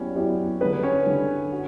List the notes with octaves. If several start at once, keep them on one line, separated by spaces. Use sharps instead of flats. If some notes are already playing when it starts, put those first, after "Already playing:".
Already playing: F#3 B3 C#4 E4 G4 D5
F#3 B3 E4 G4 D5
D3 G3 B3 D4 B4
C#4 C#5
D3 G3 D4
F#4